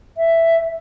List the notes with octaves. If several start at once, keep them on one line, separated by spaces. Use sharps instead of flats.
E5